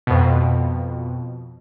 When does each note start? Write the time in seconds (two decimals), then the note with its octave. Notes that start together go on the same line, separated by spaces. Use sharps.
0.07 F2 B2